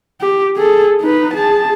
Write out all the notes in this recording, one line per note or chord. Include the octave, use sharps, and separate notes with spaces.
G4
G#4 A4
D#4 B4
G#4 A5